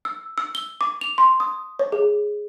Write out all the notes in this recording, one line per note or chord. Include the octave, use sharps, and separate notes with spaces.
E6
E6
G7
D6
F7
C6
D#6
C#5
G#4